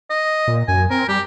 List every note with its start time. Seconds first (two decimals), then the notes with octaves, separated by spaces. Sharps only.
0.10 D#5
0.47 A#2
0.68 F#2 G#5
0.90 C4 A#4
1.08 G3 G4